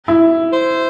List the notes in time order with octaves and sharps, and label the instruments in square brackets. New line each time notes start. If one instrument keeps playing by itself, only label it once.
[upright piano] E4
[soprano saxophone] C5